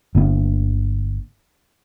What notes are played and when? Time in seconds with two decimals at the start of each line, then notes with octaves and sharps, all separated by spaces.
0.15 G1 D3 A#3 D4